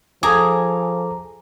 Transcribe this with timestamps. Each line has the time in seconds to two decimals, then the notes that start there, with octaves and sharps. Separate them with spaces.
0.23 F3 G#4 A4 A#5 D6